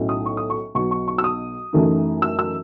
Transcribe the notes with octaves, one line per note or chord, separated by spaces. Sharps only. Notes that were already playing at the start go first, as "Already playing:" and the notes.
Already playing: B1 A2 F#3 C#4 E4
D#6
C#6
D#6
C#6
B1 B2 F#3 B3 C#6
C#6
C#6
E6
D#6
F#2 E3 A3 D#4
E6
E6